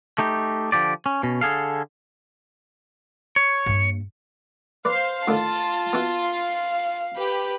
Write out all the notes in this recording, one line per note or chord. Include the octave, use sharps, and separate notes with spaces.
A3 D#4 G4
D3 F3 G4 D5
C#4
B2 C#4
D3 G#4 A4 F5
C#5
G2 A#3
B4 C5 D5 F5 C7
A2 D3 D#3 F4 A5
B3 E4 F#4
F5
G4 B4